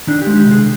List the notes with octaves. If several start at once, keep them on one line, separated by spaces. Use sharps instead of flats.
D#3 D4
G4
G#3
G4
C3
G#4